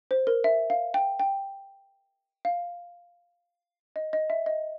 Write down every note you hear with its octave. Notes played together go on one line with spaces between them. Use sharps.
C5
A#4
E5
F5
G5
G5
F5
D#5
D#5
E5
D#5